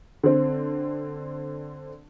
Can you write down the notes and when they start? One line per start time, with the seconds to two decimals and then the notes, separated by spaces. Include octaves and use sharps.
0.23 D3 C4